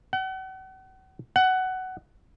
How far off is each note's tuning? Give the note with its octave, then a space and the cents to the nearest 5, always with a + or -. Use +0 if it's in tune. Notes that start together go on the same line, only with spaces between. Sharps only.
F#5 +40
F#5 +15